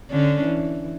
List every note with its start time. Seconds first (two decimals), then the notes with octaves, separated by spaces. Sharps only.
0.11 D3 C#4 D4
0.43 E3